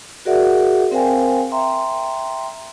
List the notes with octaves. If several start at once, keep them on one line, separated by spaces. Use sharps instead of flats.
F#4 G#4 A#4 D5 E5 F#5
C4 A#4 C5 F5 G5 G#5
E5 G5 A#5 C6